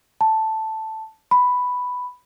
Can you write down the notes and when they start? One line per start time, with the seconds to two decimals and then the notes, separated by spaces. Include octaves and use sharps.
0.21 A5
1.31 B5